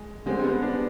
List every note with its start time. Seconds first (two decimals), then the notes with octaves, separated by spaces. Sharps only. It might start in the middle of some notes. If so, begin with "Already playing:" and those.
Already playing: G#3
0.26 D3 G3 G#3 C4 G4
0.44 B3
0.63 D4